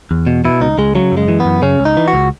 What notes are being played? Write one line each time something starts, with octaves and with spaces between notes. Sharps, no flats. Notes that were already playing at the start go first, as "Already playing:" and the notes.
E2
B2
B2 E4
C#2 D#4
C#2 G#3
C#3 F#3
F#2
G#3
E3
B3
F#2
C#3 C#4
C#2
D#4
E3
F#4
C#2